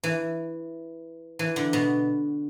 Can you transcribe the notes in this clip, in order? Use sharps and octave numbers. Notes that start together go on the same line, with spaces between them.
E3
E3
D3
B2